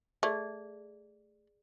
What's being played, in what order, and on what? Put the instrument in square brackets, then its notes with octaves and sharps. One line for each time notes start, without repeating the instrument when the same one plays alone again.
[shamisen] A3 [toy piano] G#4 D5